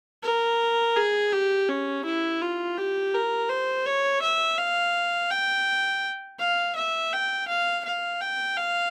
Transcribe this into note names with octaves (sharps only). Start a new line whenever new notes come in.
A#4
G#4
G4
C#4
E4
F4
G4
A#4
C5
C#5
E5
F5
G5
F5
E5
G5
F5
F5
G5
F5